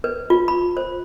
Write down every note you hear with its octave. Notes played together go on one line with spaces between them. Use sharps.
B4
F4
B5
C5